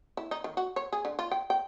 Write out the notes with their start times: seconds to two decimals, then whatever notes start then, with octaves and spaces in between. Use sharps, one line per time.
0.17 E4
0.31 D#4
0.44 D#3
0.57 F#4
0.76 C#5
0.92 G#4
1.05 D3
1.19 F4
1.31 G5
1.50 G5